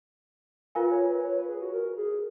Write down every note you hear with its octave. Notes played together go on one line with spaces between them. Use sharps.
F4 A#4 B4 F5 G#5
C#5
B4
C#5
B4
G#4
F#4
A#4
G#4